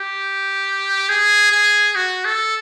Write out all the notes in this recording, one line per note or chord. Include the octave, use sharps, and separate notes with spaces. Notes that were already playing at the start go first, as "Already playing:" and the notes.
Already playing: G4
G#4
G#4
F#4
A4